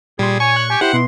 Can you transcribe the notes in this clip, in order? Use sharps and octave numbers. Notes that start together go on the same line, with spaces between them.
A#2 G3 G#4 C6
C#5 G#5 C#6
F#6
G4 G#5
E4 G4 C5 F#5
B2 C6